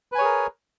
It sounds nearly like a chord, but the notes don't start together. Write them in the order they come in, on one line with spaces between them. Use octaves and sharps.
B4 G#5 C#5 G#4 A#4